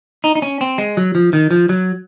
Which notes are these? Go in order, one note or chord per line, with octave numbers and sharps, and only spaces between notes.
D#4
D#4
C#4
C4
G#3
F#3
F3
D#3
F3
F#3